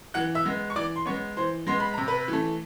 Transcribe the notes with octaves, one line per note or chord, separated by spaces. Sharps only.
E3 F#5 F#6
E5 E6
G#3 B3
C#6
E3 D5 D6
C6
G#3 B3 C#5 C#6
E3 C5 C6
G#3 B3 C6
B5
C3 A#5
B4 B5
E3 A3